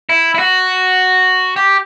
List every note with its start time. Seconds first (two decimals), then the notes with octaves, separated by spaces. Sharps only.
0.09 E4
0.35 E4
0.39 F#4
1.56 G4